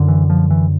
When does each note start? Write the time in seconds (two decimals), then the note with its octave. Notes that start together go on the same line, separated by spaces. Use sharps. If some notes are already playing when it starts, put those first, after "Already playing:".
Already playing: F#2 D3
0.08 E3
0.30 F3
0.51 E3